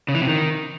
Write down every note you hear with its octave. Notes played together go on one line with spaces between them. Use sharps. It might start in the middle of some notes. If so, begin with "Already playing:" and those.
C#3
E3
C3
D#3